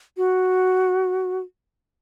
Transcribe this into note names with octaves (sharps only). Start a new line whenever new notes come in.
F#4